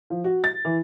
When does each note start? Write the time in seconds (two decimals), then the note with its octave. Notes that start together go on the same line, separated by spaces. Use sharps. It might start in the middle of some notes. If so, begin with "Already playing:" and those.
0.10 F3
0.24 F#4
0.44 A6
0.65 E3